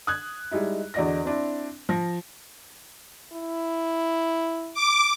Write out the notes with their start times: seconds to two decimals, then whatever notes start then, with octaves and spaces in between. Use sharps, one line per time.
0.07 D#6 F#6 G#6
0.51 G3 G#3 D#4 E4
0.94 E2 D3 F#4 D5 D#5 A#6
1.25 C4 D4 E4
1.89 F3 A#6
3.32 E4
4.74 D6